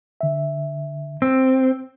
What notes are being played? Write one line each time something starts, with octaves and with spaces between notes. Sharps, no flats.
D3 E5
C4 E6